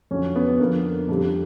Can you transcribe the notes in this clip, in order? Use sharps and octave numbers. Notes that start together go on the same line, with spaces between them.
F2 D3 F#3 C#4
B3
F2 D3 F3 A#3
F2 D3 G3